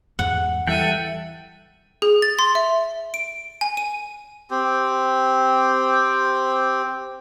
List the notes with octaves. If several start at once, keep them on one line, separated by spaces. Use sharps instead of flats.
E2 G#2 F#5
E3 G3 A4 E5 F#5 G5 D#7
G#4
A6
C6
E5
D7
G#5
D#7
C4 G4